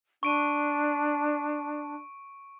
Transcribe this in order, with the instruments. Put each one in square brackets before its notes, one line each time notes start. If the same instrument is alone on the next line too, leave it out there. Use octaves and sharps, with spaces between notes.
[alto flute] D4 [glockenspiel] C#6 D7 D#7